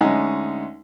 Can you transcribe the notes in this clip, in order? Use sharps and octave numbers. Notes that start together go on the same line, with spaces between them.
D2 G#3 C#4 D#4 F#5